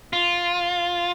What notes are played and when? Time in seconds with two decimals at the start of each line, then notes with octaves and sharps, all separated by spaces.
0.13 F4